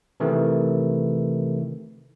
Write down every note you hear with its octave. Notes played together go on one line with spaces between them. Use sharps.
C3 D#3 E3 A3